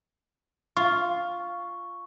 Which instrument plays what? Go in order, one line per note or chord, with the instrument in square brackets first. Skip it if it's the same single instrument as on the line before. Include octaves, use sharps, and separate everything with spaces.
[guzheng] F4 [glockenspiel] C#6